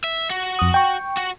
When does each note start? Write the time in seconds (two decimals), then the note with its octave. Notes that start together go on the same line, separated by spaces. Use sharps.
0.04 E5
0.30 F#4
0.59 F2 D#6
0.74 G5 C#6
1.17 F#4